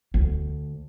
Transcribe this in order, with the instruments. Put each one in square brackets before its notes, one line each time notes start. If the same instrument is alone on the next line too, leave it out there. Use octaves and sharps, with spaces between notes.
[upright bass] D2